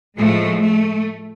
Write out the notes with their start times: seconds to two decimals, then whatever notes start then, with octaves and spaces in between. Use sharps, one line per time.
0.18 A2 F3 G#3 A3
0.62 A3